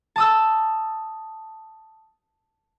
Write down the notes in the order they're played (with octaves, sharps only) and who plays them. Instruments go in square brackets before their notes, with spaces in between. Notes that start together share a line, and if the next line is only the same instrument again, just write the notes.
[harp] A5 D#6 E6